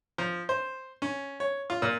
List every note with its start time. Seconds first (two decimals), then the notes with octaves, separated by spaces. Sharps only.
0.18 F3
0.49 C5
1.02 C#4
1.40 C#5
1.70 F4
1.82 A#2